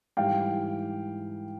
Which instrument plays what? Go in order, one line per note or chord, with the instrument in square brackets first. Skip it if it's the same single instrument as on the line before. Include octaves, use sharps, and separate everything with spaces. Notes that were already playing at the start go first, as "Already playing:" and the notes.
[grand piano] G#2 E3 G3 F5 G5